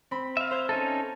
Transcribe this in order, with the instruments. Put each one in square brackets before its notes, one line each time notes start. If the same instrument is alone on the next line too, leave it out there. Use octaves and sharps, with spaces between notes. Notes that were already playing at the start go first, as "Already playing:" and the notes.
[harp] C4 B5
[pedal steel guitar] E5 F5
[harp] C5 G6 G#6
[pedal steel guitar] C#4 D#4 A4